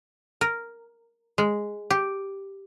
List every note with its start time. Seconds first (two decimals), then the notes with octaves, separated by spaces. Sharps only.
0.41 A#4
1.38 G#3
1.90 G4